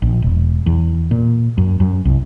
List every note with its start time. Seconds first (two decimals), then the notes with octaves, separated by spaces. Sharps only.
0.02 A#1
0.22 E1
0.66 E2
1.11 A#2
1.58 F#2
1.80 F#2
2.05 C2